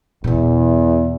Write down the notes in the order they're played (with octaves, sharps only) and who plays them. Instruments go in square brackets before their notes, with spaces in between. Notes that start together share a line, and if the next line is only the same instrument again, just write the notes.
[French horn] E2 [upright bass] B2 B3